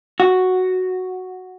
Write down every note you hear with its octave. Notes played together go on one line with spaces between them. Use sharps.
F#4